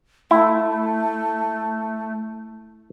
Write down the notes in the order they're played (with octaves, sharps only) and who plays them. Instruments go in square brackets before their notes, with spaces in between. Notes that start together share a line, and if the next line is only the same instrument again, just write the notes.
[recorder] A3 [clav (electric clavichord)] E4